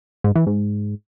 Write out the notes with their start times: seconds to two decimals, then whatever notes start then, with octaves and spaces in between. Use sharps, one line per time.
0.24 G#2
0.36 E3
0.47 G#2